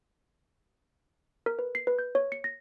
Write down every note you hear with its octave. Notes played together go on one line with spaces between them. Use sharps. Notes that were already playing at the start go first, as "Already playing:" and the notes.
A#4
B4
C7
B4
G6
C#5
C#7
A#6